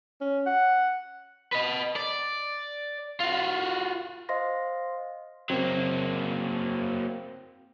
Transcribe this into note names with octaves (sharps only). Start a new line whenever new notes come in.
C#4
F#5
B4 D#5
D5
F4 F#4
C5 D#5 F5 C6 A#6
F#3 A#3 C4